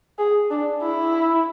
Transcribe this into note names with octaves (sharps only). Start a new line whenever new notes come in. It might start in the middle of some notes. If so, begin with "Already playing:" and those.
G#4
D4
E4